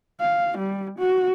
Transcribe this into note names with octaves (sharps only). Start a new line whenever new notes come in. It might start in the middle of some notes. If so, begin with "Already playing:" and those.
F5
G3
F#4